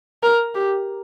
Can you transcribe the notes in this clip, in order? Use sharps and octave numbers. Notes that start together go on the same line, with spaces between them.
A#4
G4